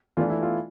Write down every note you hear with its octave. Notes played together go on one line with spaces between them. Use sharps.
E3 A3 D4 F4
E4
F4